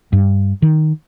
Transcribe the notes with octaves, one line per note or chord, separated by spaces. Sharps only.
G2
D#3